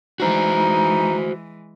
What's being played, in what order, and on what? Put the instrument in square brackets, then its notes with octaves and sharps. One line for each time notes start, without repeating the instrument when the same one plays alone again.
[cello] E3 G#3 [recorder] D#4 [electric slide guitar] F#4 C5